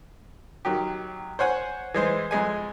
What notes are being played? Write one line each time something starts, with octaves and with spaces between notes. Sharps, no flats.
D#3 F#3 G4
C5 C#5 F#5 G#5
E3 G#3 C5
F2 G#3 G#5